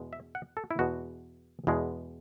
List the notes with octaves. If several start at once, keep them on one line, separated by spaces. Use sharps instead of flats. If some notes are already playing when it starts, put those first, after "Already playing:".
Already playing: E2 B2 G#3
E5
F#5
A4
E4
E2 B2 G#3 F#4
E2 B2 G#3